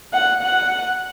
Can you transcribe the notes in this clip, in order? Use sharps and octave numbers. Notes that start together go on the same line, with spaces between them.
F#5
F#5